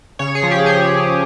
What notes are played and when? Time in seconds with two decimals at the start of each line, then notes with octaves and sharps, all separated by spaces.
0.19 C#3 C#5
0.35 G#4
0.43 F3
0.51 G4
0.66 G#4